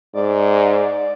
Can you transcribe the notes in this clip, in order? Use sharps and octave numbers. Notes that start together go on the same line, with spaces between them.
G#2 D5